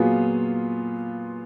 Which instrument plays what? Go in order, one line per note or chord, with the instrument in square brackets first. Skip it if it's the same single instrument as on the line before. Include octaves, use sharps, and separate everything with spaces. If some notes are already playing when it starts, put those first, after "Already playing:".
Already playing: [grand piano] A#2 F#3 B3 F4 G#4